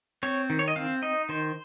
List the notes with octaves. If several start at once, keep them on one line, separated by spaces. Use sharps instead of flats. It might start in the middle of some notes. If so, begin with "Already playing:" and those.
C4 C#5
D#3
C#5
D#5
C4 F5
D#4 D#5
D#3 C5